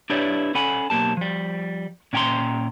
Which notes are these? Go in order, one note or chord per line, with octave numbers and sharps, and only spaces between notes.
D4 E4 G4 B4 C#5 D5
C#4 A4 F#5 G#5 B5
B1 A#3 G4 A5
F3 G3
A#2 C#4 G5 G#5 A#5 C6